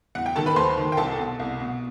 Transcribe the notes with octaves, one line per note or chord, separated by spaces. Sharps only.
E2 F#5
G5
D#3 A4 A5
B4 B5
D#2 C5 C6
D#3
G5
C2 A4 A5
B2
C2
B2